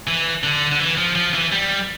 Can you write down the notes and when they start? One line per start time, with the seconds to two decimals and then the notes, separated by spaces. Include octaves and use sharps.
0.07 E3
0.44 D3
0.72 D3
0.80 E3
0.98 F3
1.16 F3
1.34 E3
1.52 G3